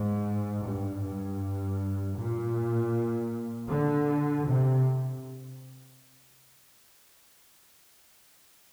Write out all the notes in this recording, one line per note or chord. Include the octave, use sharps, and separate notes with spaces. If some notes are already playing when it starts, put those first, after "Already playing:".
Already playing: G#2
G2
G2
A#2
D3
C3